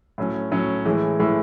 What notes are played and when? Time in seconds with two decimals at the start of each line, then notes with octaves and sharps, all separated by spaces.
0.18 A2 F#3 C#4
0.52 A2 F#3 C#4
0.86 A2 E3 G#3
1.19 A2 E3 G#3